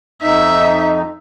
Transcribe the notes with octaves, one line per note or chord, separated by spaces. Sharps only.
F2 D#4 E5